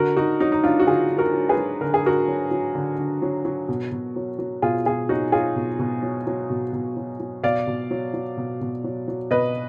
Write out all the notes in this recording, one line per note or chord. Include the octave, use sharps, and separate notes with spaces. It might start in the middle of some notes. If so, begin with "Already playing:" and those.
Already playing: D3 F#4 A#4
D3 D#4 F#4
F#3 D#4 F#4
D#4
F#3 D4 F4
F#4
D3 F4 G#4
D3
F#4 A#4
F#3
G#4 B4
F#3
D3 A#4
G#4
D3 F#4 A#4
F#3
F#3
D3
D3
F#3
F#3
B2
B2
F#3
F#3
B2 F4 G#4
B2 F4 G#4
F#3 D#4 F#4
F#3 F4 G#4
B2
B2
F#3
F#3
B2
B2
F#3
F#3
B2 D5 F5
B2
F#3
F#3
B2
B2
F#3
F#3
B2 B4 D#5